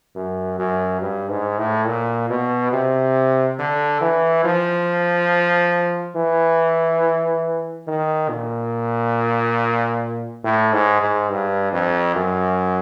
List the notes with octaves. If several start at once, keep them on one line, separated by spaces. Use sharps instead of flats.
F#2
F#2
G2
G#2
A2
A#2
B2
C3
D3
E3
F3
E3
D#3
A#2
A2
G#2
G#2
G2
F2
F#2